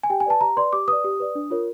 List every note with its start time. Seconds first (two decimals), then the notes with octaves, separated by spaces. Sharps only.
0.03 G#5
0.10 G4 G5
0.20 G#5
0.26 B4 D5 A5
0.41 G4 A#5
0.56 B4 D5 C6
0.73 G4 D6
0.88 B4 D5 D#6
1.04 G4
1.20 B4 D5
1.35 D4
1.50 F4 A#4 C#5